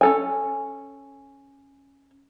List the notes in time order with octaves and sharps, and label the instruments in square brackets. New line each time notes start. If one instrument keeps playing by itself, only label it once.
[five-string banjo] C#4 A4 G#5